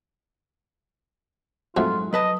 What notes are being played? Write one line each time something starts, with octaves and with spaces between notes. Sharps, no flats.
F2 G#2 F#3 A3 F4 F#4
F#3 B4 D#5 A5